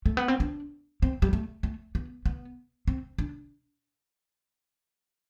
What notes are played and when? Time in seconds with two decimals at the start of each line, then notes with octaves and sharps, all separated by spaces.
0.06 A3
0.17 B3
0.28 C4
0.40 D4
1.02 C4
1.22 G3
1.33 A3
1.63 A3
1.95 B3
2.26 B3
2.88 C4
3.18 D4